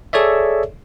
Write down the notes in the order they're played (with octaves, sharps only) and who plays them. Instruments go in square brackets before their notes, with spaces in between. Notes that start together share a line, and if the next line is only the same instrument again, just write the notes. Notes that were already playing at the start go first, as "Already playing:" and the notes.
[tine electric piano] G#4 A4 C#5 D5 E5